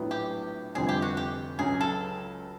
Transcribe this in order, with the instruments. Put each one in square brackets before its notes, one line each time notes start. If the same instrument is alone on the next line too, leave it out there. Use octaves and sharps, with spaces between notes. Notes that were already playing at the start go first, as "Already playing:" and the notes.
Already playing: [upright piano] A#1 A2 F#3 B3
[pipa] G4
[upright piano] F1 F2 D3 G3 [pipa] G#4
[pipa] G4
F#4
G4
[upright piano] C#2 C#3 F#3 [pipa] G#4
[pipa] A4